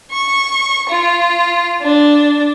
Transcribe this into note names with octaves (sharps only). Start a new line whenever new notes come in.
C#6
F4
D4